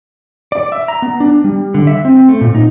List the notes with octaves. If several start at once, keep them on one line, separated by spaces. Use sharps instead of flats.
D5
E5
A#5
B3
D4
G3
D3
E5
C4
A3
A#2
D#4